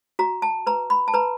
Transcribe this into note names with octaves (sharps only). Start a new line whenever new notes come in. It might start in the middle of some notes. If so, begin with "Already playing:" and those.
F#4 A#5
A5
B4 A#5
B5
A5
B4 A#5